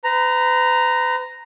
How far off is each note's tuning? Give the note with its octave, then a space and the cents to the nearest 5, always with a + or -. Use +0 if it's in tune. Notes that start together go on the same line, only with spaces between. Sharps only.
B4 +40 A#5 +0